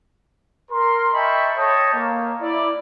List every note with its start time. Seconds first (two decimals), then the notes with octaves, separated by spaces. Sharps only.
0.71 A#4 C6
1.14 D#5 E5 G5 A5 B5 C#6
1.56 A4 C#5 D#5 G5 A5
1.94 A#3
2.41 E4 D5